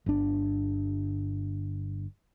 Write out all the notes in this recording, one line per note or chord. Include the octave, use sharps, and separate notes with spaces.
G1 D4